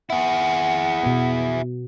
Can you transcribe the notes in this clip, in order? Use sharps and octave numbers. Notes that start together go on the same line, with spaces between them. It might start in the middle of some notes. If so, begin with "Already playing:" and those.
E4 G#4 F#5
B2 B3